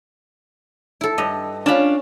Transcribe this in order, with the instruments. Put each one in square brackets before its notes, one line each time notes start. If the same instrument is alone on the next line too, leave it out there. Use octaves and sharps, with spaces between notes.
[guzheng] E4 A4
[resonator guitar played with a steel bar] G2 [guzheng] D#5
[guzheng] C#4 B5 [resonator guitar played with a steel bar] D4 F4